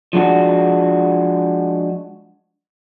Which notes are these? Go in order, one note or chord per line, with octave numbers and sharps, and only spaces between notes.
F3 G#3 D4 F#4